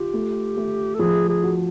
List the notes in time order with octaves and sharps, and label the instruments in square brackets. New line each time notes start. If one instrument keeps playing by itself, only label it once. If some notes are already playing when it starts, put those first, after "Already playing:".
Already playing: [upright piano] F4 [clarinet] G4
[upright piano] A3
A3
[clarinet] A4
[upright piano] F3 [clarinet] G#4
[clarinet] G#4
[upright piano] F#4